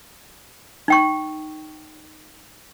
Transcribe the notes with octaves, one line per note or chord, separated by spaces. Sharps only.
D#4 G5 C#6